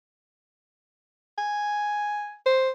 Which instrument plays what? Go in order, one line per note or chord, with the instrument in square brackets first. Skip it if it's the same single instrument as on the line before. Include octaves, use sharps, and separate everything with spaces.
[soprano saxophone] G#5
C5